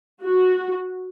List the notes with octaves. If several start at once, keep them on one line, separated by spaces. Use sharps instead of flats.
F#4